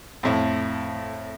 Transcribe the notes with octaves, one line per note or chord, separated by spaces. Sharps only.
F2 A2